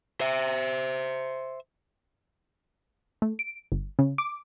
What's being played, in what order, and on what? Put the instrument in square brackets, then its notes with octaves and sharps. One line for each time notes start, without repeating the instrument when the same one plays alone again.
[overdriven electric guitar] C5 E5
[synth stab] A3
D7
G1
C#3
D6